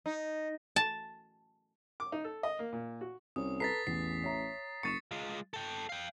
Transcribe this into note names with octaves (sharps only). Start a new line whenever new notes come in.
D#4
A5
D6
D#4
A4
D#5
A#3
A#2
F#4
C2 C#4 D#6
A4 B4 A#5 A6 B6 C7
A1 E2 C7
C#5 E5 A#5
F#1 C#6 A6 C#7 D#7 E7
G#3 F4
A4 G5
F5 G5